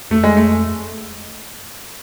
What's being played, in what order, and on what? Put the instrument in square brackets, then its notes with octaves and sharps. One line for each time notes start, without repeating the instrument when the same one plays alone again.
[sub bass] F2 [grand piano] A3
[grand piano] G#3
A3